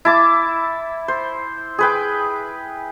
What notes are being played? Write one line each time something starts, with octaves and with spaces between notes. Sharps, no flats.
E4 A5 D6
C5
G#4 B4 G5